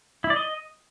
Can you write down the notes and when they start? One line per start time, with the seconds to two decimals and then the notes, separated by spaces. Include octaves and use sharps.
0.24 E4
0.30 D5
0.36 D#5